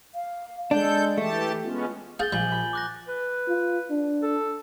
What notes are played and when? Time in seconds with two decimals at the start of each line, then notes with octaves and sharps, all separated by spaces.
0.15 F5
0.71 G#3 D4 A4 G6
1.18 E3 A3 G4 A5
1.64 G#3 B3 C#4 F4
2.20 G#4 F5 G6 A6 G7
2.33 A#1 G3 G#5 F#7 G7
2.52 B5
2.73 D6 F#6 A#6
3.08 B4
3.48 F4
3.91 D4
4.22 A4